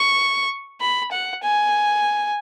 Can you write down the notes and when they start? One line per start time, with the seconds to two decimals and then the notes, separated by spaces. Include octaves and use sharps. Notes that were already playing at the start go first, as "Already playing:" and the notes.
Already playing: C#6
0.81 B5
1.12 F#5
1.43 G#5